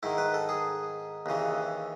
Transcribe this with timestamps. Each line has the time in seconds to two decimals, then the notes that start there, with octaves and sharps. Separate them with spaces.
0.03 G#2 D#3 E4
0.18 B4
0.34 A4
0.49 G#4
1.26 D#2 C#3 E3